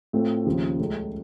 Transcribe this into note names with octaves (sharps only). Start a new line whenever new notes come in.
A2 A3 C4 F4
D#2 C#3 F3
C#2 C#3 A3